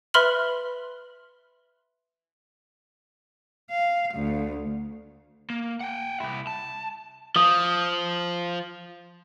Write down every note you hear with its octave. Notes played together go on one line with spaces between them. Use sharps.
B4 E5 B5 C6 F6 F#7
F5
D2
A#3
F#5 G5
C2 E4
A5
F3 D#6